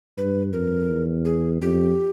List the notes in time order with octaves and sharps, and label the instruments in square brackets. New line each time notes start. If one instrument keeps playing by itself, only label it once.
[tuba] G2 [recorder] B4
[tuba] F2 [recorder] A#4
[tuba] E2
[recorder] G#4
[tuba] F2 [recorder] G4